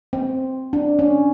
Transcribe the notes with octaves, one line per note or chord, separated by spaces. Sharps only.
C4
D4
C#4